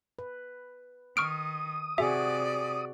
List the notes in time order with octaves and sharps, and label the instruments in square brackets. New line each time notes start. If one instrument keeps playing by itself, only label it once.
[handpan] B4
[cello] D#3 [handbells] C#6 F6 D7 [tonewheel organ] D#6
[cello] C3 D5 [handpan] F#4 G#4 [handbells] E5